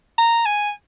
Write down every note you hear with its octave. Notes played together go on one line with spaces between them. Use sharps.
A#5
G#5